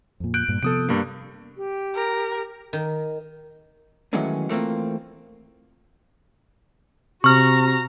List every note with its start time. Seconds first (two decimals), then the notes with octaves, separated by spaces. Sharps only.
0.20 F2 A#2
0.34 F#6 G6 D7
0.48 G2 A#2
0.63 C3 F3 B3 A4 D#6 D7
0.89 G2 A#3
1.57 G4
1.95 A#4
2.73 D#3
4.13 D#3 E3 F#3 G#3 A3 C#4
4.49 E3 A3 A#3 C4 F4
7.24 C3 F#4 A#5 C#6 F6